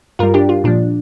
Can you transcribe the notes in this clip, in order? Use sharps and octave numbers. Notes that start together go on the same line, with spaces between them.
G2 G3 F4 A#4
D4 G4
F4
A#2 F3 D4